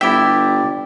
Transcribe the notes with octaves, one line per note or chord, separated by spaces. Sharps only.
G1 E4 G4 D5 E5 G5